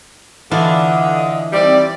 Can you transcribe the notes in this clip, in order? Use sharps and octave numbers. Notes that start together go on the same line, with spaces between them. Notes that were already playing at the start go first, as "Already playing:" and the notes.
D3 E3 D4 F4 D#5
D#2 G3 C4 D5